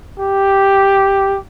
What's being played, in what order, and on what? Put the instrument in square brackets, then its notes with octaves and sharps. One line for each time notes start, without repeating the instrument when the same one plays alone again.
[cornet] G4